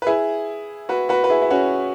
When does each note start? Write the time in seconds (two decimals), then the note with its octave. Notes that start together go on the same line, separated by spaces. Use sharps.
0.02 B4
0.07 E4 G#4
0.89 F#4 B4
1.09 F#4 B4
1.24 B4
1.30 E4 G#4
1.42 E4
1.50 C#4 F#4